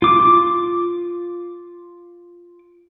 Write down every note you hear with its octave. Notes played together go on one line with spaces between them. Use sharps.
F4 D6